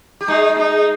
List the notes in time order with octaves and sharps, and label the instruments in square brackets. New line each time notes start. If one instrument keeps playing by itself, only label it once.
[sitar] G4
[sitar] G#3 G#4 [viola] D#4
[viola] D#4